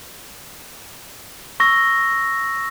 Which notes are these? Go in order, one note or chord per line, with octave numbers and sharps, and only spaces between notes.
C#6 E6 A#6